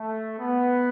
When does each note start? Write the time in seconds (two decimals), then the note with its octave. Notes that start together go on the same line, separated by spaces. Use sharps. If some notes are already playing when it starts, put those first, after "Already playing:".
Already playing: A3
0.40 B3